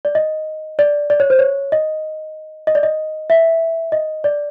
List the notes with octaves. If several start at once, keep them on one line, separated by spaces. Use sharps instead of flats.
D5
D#5
D5
D5
C#5
C5
C#5
D#5
D#5
D5
D#5
E5
D#5
D5